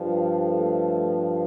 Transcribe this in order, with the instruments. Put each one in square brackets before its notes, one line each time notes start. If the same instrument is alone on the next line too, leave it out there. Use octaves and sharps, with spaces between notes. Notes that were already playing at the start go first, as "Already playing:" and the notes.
Already playing: [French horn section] G2 F3
A3